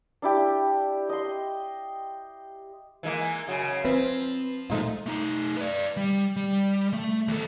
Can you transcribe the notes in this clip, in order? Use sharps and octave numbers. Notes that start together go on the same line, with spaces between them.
D4 E4 G4
D#5 C6
E3 G#3 A#3
F#2 C#3 F#4
F3 C4 B4
A#2 F3 G#3 A3 D#4 F4
A3 D#4
B4 D5
G3
G3
A3
E2 A4